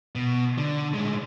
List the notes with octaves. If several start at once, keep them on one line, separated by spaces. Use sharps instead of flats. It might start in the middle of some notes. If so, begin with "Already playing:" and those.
B2
D3
A2 G#3